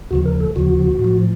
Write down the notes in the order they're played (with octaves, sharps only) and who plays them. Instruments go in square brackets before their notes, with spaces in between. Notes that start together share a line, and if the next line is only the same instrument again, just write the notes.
[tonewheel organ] D#2 C#3 F3 F#4
A#4
A4
D#2 C#3 F3 F#4
A2
F3